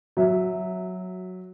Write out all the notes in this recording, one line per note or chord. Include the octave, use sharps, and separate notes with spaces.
F#3 E5